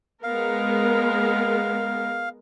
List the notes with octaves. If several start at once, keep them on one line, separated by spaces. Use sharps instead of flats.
G#3 B3 A#4 F5